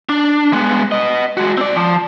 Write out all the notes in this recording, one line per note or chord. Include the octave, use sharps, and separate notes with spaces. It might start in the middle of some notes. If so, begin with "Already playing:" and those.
D4
G#3 B3
B4 D#5
G#3 F#4
C4 D5
F3